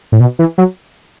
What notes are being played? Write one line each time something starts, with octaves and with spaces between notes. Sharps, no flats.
A2
B2
E3
F#3